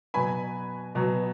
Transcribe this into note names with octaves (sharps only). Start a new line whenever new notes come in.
B2 F#3 B3 G#5 B5
B2 F#3 B3